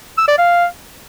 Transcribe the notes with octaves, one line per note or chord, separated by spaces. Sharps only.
E6
D5
F5